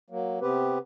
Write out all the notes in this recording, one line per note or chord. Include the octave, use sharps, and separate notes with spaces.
F#3 A#3
C3 B3 C4 G4 B4